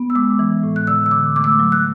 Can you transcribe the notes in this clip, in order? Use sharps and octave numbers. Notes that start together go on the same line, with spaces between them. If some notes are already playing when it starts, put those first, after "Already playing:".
Already playing: B3
E6
G#3 D6
E3
A2
F#6
D3 E6
E6
D3 D6
A3 D6
E6
D6
F#3
F#6